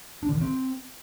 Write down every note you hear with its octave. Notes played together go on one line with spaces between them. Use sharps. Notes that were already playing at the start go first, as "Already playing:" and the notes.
D4
D3
D#3
C4